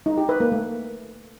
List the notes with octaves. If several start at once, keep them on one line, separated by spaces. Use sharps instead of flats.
D#4
G4
B4
A#3
A3